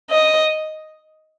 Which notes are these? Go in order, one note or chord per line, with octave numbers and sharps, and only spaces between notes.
D#5